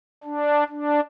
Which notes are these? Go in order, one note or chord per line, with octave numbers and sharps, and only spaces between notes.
D4
D4